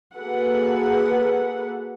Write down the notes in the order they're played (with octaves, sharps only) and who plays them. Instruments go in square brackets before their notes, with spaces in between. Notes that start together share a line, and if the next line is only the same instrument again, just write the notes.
[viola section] A#3 F#4 G#4 A4 B4 F#5